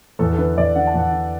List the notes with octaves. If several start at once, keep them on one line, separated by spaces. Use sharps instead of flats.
E2 A4
A4
D3 B4
E2 D5
D3 F#5
A5
E2 F#5
D3